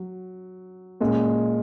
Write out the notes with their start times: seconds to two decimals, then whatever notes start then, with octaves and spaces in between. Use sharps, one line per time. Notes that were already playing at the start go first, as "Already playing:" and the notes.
Already playing: F#3
1.01 A#2 G#3 C#4